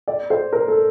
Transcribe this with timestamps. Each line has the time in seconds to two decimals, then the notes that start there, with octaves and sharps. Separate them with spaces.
0.08 D5
0.30 C5
0.53 A#4
0.68 A4